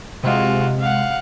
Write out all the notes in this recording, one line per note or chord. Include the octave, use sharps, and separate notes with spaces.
C3 G#3 F4 F#4
F5 F#5